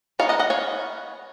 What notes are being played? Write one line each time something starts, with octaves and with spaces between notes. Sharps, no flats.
G#3 B3 D#4 C#5 F5
D#5 F#5
D#5 F#5
C#5 F5